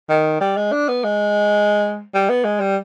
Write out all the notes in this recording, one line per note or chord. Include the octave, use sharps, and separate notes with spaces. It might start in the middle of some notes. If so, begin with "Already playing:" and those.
D#3
G3
G#3
D4
B3
G#3
G3
B3
G#3
G3